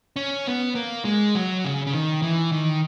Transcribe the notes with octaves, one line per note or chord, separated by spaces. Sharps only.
C#4
B3
A#3
G#3
F#3
C#3
C#3
D#3
E3
D#3